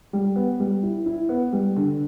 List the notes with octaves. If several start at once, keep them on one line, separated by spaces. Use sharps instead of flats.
G3
B3
G3
E4
E4
B3
G3
D3